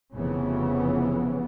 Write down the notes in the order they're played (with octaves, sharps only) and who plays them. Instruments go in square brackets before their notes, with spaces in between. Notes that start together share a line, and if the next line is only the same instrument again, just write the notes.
[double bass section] F1 C#3 E3 B3